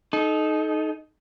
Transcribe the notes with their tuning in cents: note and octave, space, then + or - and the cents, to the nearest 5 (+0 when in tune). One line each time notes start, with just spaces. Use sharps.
D#4 +0 A4 -35